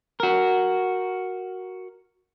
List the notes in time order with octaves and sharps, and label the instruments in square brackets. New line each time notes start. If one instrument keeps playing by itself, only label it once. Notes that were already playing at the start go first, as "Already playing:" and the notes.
[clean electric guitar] F#4 A#4